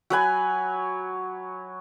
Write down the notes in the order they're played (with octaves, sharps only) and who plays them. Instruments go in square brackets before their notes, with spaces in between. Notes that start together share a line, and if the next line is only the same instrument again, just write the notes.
[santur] F#3 B4 G#5